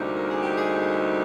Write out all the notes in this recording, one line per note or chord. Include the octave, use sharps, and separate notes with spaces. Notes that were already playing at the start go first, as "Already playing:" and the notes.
Already playing: D2 C3 G3 A#3 D#4
A#4
G#4
G4
G#4